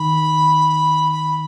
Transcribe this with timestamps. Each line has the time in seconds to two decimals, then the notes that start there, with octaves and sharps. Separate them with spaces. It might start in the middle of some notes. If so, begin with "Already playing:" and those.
Already playing: D#3 B5
1.12 B5